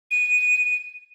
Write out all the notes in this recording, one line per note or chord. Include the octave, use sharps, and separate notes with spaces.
D#7